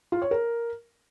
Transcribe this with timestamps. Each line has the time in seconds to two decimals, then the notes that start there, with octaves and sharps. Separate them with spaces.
0.12 F4
0.22 C#5
0.31 A#4